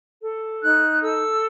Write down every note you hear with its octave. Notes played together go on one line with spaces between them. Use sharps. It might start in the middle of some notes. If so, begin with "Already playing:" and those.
A4
D#4 F#6
A4 E6